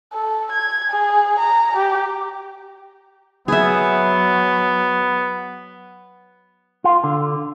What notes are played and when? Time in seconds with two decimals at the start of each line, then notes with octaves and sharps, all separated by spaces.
0.13 A4
0.52 G#6
0.90 G#4
1.39 A#5
1.77 G4
3.48 F#3 B3 G#4 E5
6.84 F4
7.04 D3